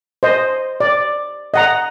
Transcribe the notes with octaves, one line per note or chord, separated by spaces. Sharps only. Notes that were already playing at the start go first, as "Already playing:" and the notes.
C5 D#5
D5
D#5 F#5 A#5